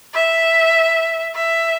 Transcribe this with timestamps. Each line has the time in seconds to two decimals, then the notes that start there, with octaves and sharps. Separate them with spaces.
0.14 E5
1.35 E5